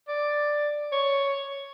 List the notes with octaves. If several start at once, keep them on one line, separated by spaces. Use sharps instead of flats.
D5
C#5